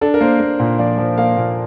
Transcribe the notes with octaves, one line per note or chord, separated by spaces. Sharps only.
D4 A4
A#4
A#3 C5
A#3
A#2
F3 D5
F3
A#3 F5
A#2